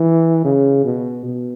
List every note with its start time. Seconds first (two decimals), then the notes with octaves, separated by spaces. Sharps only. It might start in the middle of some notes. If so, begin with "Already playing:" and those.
Already playing: E3
0.45 C#3
0.85 B2
1.26 B2